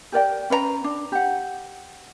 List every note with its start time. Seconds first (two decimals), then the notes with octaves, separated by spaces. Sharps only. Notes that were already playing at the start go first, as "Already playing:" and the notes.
0.12 G4 A#4 D5 G5
0.50 C#4 B4 C5 A#5
0.84 D4
1.12 G4 F#5